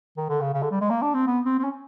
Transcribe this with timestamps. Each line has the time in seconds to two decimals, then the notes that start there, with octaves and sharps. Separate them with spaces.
0.17 D#3
0.29 D3
0.41 C#3
0.54 C#3
0.62 D3
0.71 G3
0.81 G#3
0.90 A#3
1.02 D4
1.14 C4
1.27 B3
1.45 C4
1.58 C4
1.64 C#4